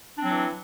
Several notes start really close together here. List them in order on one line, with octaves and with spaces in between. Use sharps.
D4 C4 F#3 E3